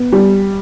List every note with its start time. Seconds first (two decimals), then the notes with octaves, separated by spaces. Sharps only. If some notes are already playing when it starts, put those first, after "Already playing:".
Already playing: B3
0.12 G3